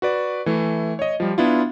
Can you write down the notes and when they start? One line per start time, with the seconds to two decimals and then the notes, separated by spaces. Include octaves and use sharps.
0.02 F#4 B4 D5
0.46 E3 A3
0.99 C#5 D#5
1.20 F3 G3
1.38 B3 D4 E4 F4